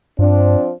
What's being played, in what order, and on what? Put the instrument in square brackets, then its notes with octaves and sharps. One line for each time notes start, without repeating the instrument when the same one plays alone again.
[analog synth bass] G2 [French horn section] F3 C4 D4